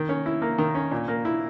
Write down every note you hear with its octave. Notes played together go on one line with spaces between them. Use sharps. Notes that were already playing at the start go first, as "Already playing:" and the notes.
Already playing: D#3
C#4
E4
A#3
D#3
C#4
A#2
A#3
E4